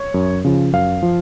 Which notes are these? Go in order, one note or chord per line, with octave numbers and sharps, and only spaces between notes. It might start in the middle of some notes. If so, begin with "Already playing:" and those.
Already playing: C#5
F#2
C#3 F3
F#2 F5
F3